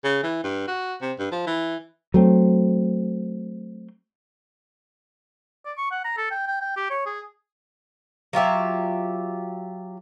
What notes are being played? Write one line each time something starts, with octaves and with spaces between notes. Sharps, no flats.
C#3
E3
G2
F#4
C3
G2
F3
E3
F#3 A3 C4
D5
C#6
F#5
A#5
A4
G5
G5
G5
G4
C#5
G#4
F#3 F4 G4 E5